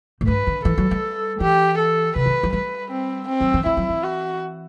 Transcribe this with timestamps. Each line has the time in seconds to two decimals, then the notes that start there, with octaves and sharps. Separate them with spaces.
0.21 A2
0.27 G2 B4
0.47 D3
0.65 E3 A4
0.78 F#3
0.91 G3
1.40 E3 G4
1.78 A4
2.16 C3 B4
2.26 E3
2.43 F#3
2.53 G3 B4
2.91 C4
3.28 C4
3.40 F#3
3.54 E3
3.66 E3 E4
3.77 F#3
3.89 E3
4.04 F#4